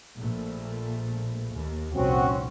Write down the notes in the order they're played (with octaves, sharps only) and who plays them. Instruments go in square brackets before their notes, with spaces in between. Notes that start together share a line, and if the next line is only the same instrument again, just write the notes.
[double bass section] A#1 A#2 A3
D#2
[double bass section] F1 C2 A#2 [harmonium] C4 C#4 F#4